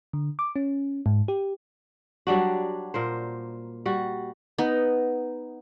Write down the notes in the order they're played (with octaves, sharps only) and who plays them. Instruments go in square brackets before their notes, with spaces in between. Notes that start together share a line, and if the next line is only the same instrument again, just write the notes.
[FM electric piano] D3
D6
C#4
G#2
G4
[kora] F#3 G3 D4 F#4
A#2 A#4 C5
G3 F#4
[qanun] B3 D#4